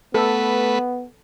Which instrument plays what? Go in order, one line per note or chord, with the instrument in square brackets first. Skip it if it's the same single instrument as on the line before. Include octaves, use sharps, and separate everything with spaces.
[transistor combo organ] A3 B4 [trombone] B3 [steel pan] A4